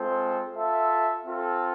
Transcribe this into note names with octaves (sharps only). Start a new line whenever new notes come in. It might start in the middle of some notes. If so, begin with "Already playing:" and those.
Already playing: G#3 C4 F4 A4 C5
F4 A4 E5
C4 F4 A4